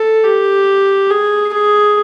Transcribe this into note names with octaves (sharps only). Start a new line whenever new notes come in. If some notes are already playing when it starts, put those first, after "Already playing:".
Already playing: A4
G4
G#4
G#4